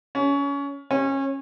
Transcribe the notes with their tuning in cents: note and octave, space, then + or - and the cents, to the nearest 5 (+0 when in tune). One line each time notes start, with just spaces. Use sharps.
C#4 +25
C#4 -25